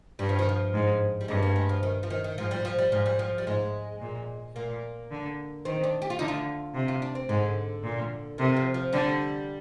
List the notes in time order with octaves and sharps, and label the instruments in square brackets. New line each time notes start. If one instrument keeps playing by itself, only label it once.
[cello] G2 [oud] G3
[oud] F3
D#3
F3
[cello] G#2
[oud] G3
[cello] G2 [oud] G#3
[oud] A#3
G#3
F3
D#3
F3
D#3
D#3
[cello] G#2 [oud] F3
[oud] G3
F3
G3
[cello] G#2 [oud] F3
[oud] G3
F3
G3
[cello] G#2 [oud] G#3
[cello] A#2
[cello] A#2 [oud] A#3
[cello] D3
[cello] D#3 [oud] C4
[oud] D4
G4
F4
[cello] D3 [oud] D#4
[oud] F4
[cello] C3
[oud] F4
D4
C4
[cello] G#2 [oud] D3
[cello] A#2
[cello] C3 [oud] D#3
[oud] F3
F3
[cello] D3 [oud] G3